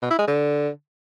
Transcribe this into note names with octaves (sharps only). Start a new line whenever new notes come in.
B2
E4
G#3
D3